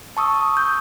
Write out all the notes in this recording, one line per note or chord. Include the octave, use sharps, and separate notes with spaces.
A5 C#6 D#6 E6
G6